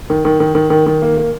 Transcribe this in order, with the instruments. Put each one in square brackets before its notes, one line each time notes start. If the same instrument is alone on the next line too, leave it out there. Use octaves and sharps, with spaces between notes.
[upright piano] D#3
D#3
D#3
D#3
D#3
D#3
A#3
A#3